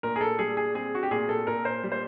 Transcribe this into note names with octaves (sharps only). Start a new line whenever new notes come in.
A#2 A#4
G#4
A4
G3 G#4
G#4
C4 G#4
F#4
G4
A#2 G#4
A4
A#2 A#4
C5
G3
C5